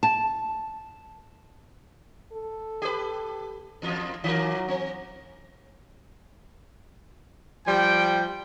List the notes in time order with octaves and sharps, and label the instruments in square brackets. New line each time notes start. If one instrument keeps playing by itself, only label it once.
[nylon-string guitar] A5
[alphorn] A4
[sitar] G4 B4
E2 F4
[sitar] D#3 A#4 [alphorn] F#3
[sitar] C4
[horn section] F3 G3 G5